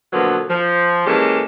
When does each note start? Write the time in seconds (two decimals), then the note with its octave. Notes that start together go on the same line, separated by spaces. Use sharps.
0.12 B2 D3 F3 F#3 A#3 B3
0.49 F3
1.05 E3 G#3 A#3 C#4 G4 A4